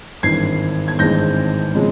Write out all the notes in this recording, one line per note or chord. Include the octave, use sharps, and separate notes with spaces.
G#1 G2 E3 G#6 C7
G#6
G#1 G2 E3 G#3 C4 G6 A#6
C#3 F3 G#3 C4